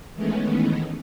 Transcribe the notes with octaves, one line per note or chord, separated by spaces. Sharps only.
D#3 E3 G#3 A3 B3 C#4